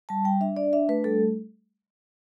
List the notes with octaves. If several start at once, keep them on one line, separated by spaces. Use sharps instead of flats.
G3 A5
G3 G5
D4 E5
D4 D5
D4 E5
A3 B4
G3 A4